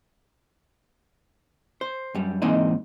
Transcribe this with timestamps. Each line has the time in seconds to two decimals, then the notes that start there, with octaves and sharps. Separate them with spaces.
1.81 C5
2.15 F#2 G3
2.42 G#2 E3 A#3 C4 D#4 D#5